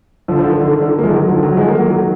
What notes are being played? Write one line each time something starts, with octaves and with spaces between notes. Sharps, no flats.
D3 F3
D3 F3
D#3
D3
D#3
D3
D#3
A#3
F3 G#3
D#3 F#3
D3 F3
D#3 F#3
F3 G#3
F#3 A#3
F#3 A#3
D#3 F#3